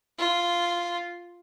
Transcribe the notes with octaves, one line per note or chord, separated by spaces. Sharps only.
F4